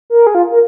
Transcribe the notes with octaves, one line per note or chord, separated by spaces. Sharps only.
A#4
G#4
F4
A#4